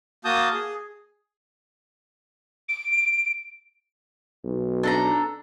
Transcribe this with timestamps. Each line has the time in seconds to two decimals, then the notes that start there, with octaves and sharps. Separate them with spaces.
0.25 A#3 F#4 A5 D#6 G6
0.54 G#4
2.69 D7
4.44 B1
4.83 D4 A4 A#5